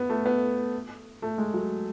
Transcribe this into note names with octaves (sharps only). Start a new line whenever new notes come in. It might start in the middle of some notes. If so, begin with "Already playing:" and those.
Already playing: B3
A3
B3
A3
G#3
F#3